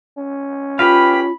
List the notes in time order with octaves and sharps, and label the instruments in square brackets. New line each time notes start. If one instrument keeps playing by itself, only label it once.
[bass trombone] C#4
[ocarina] F4 [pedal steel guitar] G4 B4 F5 [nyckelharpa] B5